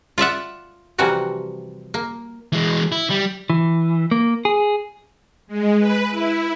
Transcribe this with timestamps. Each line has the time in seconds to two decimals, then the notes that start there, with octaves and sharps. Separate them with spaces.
0.18 F4 D5 E5 F#5
0.98 C3 E3 F3 G3 F#4 A#4
1.94 A#3
2.52 E3 G#3
2.92 E4
3.10 G3
3.50 E3
4.11 A#3
4.45 G#4
5.47 G#3
5.78 B4
6.10 E4